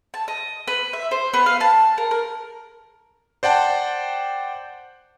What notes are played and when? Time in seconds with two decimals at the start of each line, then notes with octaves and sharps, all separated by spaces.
0.14 A5
0.28 D#5
0.68 B4
0.93 E5
1.11 C5
1.34 B3
1.46 F5
1.61 A5
1.98 A#4
2.11 A#4
3.43 C5 D5 F#5 G5 A5